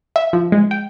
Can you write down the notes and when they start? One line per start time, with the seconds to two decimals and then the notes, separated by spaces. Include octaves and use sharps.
0.16 E5
0.33 F3
0.52 G#3
0.71 G5